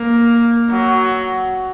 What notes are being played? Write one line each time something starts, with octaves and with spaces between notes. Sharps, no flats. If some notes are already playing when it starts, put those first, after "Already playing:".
Already playing: A#3
F#3